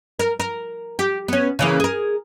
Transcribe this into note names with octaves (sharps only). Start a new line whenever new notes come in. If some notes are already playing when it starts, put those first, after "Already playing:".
A#4
A#4
G4
B3 C#4
C#3 E3 A#3
G#4 A#4